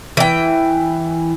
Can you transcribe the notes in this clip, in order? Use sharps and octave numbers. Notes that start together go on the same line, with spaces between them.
E3 G5